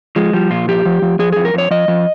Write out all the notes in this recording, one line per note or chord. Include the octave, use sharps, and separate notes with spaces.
F3 G#3
F3 G3
A#2 F4
F3 G4
F3
F3
F3 G#4
F2 G#4
A#4
F2 C#5
F3 D#5
F3